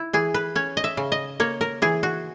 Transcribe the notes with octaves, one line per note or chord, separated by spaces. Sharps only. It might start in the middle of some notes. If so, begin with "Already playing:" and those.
Already playing: E4
E3 G#4
B4
C#4 C#5
D#5
E5
C#3
D#5
A#3 C#5
A#4
E3 G#4
F#4